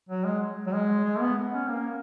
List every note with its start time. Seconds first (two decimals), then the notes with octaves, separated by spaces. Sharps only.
0.09 F#3
0.24 G#3
0.67 F#3
0.73 G#3
1.04 G#3
1.20 B3
1.52 C#4
1.68 A#3